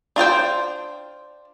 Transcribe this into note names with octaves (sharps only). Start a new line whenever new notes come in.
D4 F4 C5 G5